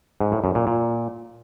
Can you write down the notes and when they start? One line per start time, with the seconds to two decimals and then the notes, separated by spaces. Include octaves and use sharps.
0.21 G#2
0.32 A2
0.44 F#2
0.55 A#2
0.67 A#2